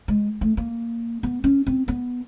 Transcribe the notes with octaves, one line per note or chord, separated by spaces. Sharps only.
G#3
A3
A#3
B3
C#4
C4
B3